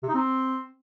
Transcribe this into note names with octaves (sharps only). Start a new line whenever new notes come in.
C3
D#4
C4